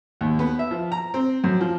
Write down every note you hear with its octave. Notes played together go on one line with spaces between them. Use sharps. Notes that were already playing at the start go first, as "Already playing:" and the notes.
D#2
B3
E5
F3
A#5
C4
F#2
F3